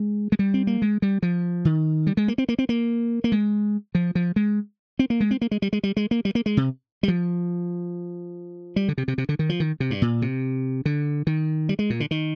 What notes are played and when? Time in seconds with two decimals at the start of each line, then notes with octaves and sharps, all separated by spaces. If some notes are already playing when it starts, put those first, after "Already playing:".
Already playing: G#3
0.32 G#3
0.39 G3
0.54 C4
0.67 A#3
0.82 G#3
1.02 G3
1.23 F3
1.65 D#3
2.07 G3
2.17 G#3
2.28 A#3
2.38 C4
2.49 A#3
2.59 C4
2.69 A#3
3.24 A#3
3.32 G#3
3.95 F3
4.15 F3
4.36 G#3
4.99 C4
5.10 A#3
5.20 G#3
5.31 C4
5.41 A#3
5.51 G#3
5.62 G3
5.73 G#3
5.83 G3
5.97 G#3
6.11 A#3
6.25 G3
6.35 A#3
6.46 G#3
6.57 C3
7.03 G3
7.08 F3
8.76 G3
8.88 D3
8.98 C3
9.08 C3
9.18 C3
9.29 D3
9.39 D#3
9.49 F3
9.60 D#3
9.80 C3
9.90 G2
10.02 A#2
10.22 C3
10.85 D3
11.27 D#3
11.69 G3
11.79 G#3
11.90 A#2
12.00 D3
12.11 D#3